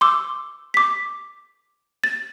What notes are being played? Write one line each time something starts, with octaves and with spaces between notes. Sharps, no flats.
C6 D6 E6
D6 B6
A6